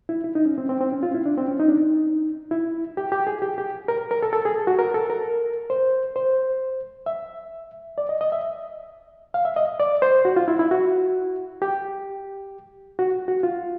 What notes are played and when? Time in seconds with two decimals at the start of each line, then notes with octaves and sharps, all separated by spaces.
0.09 E4
0.24 E4
0.35 D#4
0.46 C#4
0.58 C4
0.69 C4
0.80 C4
0.92 C#4
1.03 F4
1.14 E4
1.26 D4
1.37 C4
1.48 C#4
1.60 D#4
1.68 D4
1.75 D#4
2.51 E4
2.97 G4
3.12 G4
3.27 G#4
3.42 G4
3.58 G4
3.88 A#4
4.11 A#4
4.23 A4
4.33 A4
4.45 G#4
4.67 F#4
4.79 A#4
4.94 A4
5.10 A#4
5.70 C5
6.16 C5
7.06 E5
7.98 D5
8.09 D#5
8.21 D#5
8.32 E5
9.34 F5
9.45 E5
9.56 D#5
9.80 D5
10.02 C5
10.25 F#4
10.36 F4
10.48 E4
10.59 E4
10.71 F#4
11.62 G4
12.99 F#4
13.28 F#4
13.43 F4